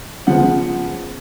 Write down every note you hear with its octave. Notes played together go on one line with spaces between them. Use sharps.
C#3 F3 G#3 B3 F#5